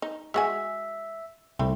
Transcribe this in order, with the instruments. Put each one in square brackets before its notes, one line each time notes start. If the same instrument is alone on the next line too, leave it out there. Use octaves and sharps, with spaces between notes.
[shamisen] D#4
[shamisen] G#3 F#4 G#5 [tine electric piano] E5
[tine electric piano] C2 [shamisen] A3 C4 B5